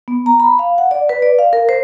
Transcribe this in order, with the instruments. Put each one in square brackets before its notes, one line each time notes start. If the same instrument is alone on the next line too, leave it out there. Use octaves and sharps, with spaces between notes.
[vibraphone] B3
A#5
B5
F5
F#5
D5
B4
D5
F5
A#4
C5